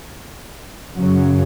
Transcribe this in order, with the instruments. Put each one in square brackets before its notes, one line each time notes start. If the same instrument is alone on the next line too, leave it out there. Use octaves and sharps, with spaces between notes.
[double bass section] F#2 C#3 F#3